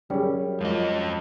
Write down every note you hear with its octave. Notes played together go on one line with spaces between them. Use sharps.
F#2 G3 C#4 G#4 D5
F2 G#3 F4 D#5